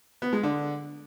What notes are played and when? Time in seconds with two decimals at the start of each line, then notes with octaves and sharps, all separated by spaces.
0.22 B3
0.33 G#3
0.43 D3